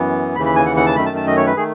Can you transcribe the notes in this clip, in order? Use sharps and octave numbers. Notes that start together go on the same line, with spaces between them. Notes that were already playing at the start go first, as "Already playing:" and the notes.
Already playing: F#2 E3 B3
D#2 C#3 E3 B5
B5
G#5
F#5
F#5
A5
F#2 D#3 A3 B5
A5
A5
D#5
C#5
B4
D#3 A3 G#4